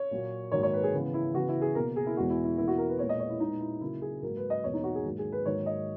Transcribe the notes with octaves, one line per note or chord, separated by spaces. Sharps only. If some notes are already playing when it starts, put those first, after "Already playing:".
Already playing: C#5
A#2 F#3 A#3
G#2 D#3 F#3 A#3 C#5
C#5
B4
G#4
C#3 E3 B3
E4
C#3 E3 B3 F#4
E4
G#4
B2 A#3 A#4
G#4
E4
E2 B2 G#3 B3 F#4
E4
E4
E2 B2 A#3 E4
F#4
A#4
B4
A#2 G#3 B3 C#5
D#5
C#5
E4
A#2 G#3 B3 D#4
E4
C#3 F#3 A#3 E4
G#4
G#2 F#3 A#3 A#4
B4
D#5
E2 B2 A#3 C#5
D#4
F#4
G#4
G#2 D#3 F#3 A#3
G#4
B4
G#2 D#3 F#3 A#3 C#5
D#5